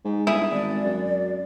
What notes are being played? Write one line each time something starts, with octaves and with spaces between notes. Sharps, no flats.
G#2
G1 E4 G#4
G#1 D5
F#2